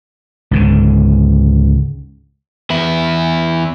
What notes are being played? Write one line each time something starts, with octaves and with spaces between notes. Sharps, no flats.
C#2 G#2 D3
E2 E4